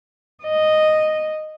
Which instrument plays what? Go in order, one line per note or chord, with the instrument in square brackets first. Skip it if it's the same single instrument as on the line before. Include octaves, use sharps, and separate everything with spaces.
[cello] D#5